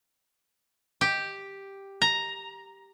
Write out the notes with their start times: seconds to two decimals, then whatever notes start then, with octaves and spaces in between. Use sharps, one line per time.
1.01 G4
2.02 A#5